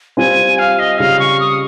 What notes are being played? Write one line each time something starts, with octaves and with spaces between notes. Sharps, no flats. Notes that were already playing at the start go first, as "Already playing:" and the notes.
G3 C4 F4 G#5
F5
D#5
C#3 G3 C#4 F4 F5
C#6
D#6